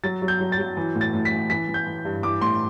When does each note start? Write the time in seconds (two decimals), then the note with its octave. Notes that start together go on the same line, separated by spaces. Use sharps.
0.04 F#3 A6
0.22 F#3
0.28 G6
0.40 F#3
0.52 A6
0.58 F#3
0.77 E3
0.95 A2
1.01 A6
1.14 A2
1.25 B6
1.31 E3
1.50 E3 B6
1.68 E3
1.74 G6
1.87 E3
2.05 G2
2.23 E3 D6
2.41 A2 C6